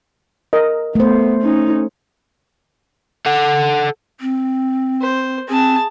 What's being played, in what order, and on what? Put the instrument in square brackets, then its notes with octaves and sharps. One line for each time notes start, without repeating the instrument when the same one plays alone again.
[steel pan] A#4 D#5
[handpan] A3 C5 [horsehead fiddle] B3
[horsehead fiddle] C#4 D#4
[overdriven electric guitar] A4 F#5
[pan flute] C4
[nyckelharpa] C5
[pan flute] C4 [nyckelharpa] G#4 A5